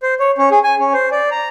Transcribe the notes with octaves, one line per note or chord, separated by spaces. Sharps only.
C5
C#5
C#4
G#4
G#5
C#4
C5
D5
A#5